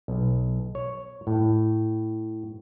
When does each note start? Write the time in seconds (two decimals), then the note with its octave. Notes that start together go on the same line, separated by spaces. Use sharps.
0.08 B1
0.75 C#5
1.27 A2